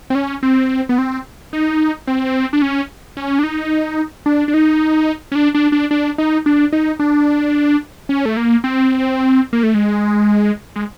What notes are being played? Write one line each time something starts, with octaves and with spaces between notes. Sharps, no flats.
C4
C#4
C4
B3
C4
D#4
C4
D4
C#4
C#4
D4
D#4
D4
D4
D#4
C#4
D4
D4
D4
D4
D#4
D4
D#4
D4
C#4
A3
A#3
C4
A#3
A3
G#3
G#3